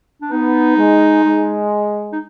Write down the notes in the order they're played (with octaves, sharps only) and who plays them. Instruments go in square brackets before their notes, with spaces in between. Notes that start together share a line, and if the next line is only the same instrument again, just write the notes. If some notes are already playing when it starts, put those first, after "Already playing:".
[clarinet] D4
[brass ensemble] B3 [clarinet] D#4
[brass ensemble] G#3
G#3
[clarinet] D#4